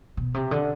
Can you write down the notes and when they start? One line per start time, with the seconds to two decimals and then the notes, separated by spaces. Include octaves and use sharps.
0.17 B2
0.34 C3
0.51 D3